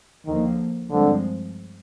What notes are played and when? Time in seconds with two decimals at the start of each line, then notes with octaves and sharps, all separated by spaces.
0.26 D#2 D3 D#3 F3 A#3
0.90 G2 D3 F3 G#3 C4